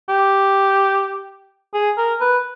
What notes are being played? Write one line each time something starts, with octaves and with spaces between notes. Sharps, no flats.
G4
G#4
A#4
B4